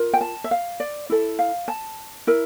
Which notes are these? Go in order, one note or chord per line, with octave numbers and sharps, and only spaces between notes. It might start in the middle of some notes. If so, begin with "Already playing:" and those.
Already playing: F4 A#4
G5
A5
E5
F5
D5
E4 A4
F5
A5
E4 A#4